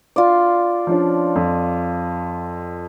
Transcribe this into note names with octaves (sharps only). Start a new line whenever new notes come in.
F4 D5
F3 C#4 D4
F2